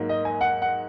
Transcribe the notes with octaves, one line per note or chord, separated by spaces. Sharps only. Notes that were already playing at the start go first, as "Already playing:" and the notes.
Already playing: G#2 F#3 A#3
D#5
G#5
F#5
F#5